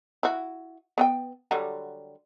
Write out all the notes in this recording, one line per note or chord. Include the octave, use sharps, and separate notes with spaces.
E4 F#4
B3 D#5 G5
D3 F#3 G3